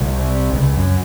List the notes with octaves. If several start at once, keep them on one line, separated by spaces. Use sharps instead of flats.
C2
C#2
F#2